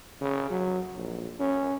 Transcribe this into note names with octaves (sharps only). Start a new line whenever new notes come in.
C#3
F#3
A#1
C#4